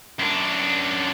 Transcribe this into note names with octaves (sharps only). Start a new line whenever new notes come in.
F#2 D4